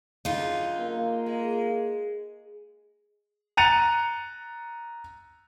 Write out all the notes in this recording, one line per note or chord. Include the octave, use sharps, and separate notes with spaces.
F#2 D3 D#4 F4 G#4
A#3
G#3
A#5 F#6 A6 C#7 D#7 F7